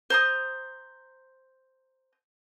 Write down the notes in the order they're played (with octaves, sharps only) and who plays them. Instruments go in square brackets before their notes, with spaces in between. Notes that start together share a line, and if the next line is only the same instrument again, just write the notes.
[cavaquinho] C5 A#5 D#6